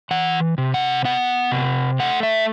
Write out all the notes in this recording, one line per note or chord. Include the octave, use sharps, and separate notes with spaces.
E3 F#5
C3
F#5
B3 F#5
C3
A3 F#5
E5